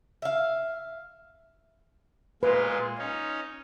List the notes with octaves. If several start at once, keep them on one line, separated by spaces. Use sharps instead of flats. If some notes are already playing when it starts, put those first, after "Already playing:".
E5 F5
A#2 G#3 F4 B4
C#4 D#4